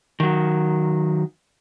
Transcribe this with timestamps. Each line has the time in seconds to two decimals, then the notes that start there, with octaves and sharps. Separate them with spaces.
0.20 D#3 F#3